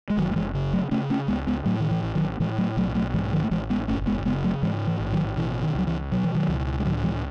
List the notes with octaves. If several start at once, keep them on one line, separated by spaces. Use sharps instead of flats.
G#3
F#1 D#3 F#3
A3
E3 G#3
C#3
F#3 A3
C#3 A3 C#4
A3 C#4
C#2 G#3 B3
G#3 B3
A2 F#3 A3
D#3
E3
A1
D#3 F#3
A2 E3 G#3
F#3 A3
B1 F#3 A3
F#3 A3
G#2 E3 G#3
D#3 F#3
A3
A1 E3 G#3
G#3 B3
F#1 A3 C#4
G#3 B3
C#3 G#3 B3
F#3 A3
G#2 E3 G#3
E3
A1
D#3 F#3
B2 E3
D#3
C#2 F#3
E3
B2 F#3
E3
D#3 F#3
C#2
G#3
A2 D#3 F#3
E3 G#3